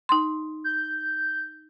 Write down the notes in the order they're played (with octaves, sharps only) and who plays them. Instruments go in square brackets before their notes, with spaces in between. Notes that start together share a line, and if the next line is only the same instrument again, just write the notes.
[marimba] D#4 C6
[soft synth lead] G6